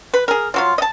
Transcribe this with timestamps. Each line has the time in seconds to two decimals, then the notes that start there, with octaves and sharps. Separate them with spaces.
0.14 B4
0.28 G#4 A#4
0.54 F3 F#3 F4
0.78 D#5 A5